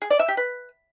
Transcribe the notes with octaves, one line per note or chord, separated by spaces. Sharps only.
G#4
D5
E5
G4
B4